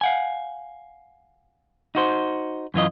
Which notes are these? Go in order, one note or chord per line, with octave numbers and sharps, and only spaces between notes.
F5 F#5 G#5
D#4 F#4 C5
F#2 E3 F4 D#5